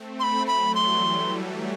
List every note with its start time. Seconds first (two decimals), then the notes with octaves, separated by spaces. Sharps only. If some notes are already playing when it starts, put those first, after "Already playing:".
Already playing: A3 C4
0.20 C6
0.23 B5
0.47 F#3 A3 B5
0.75 E3 G3 C6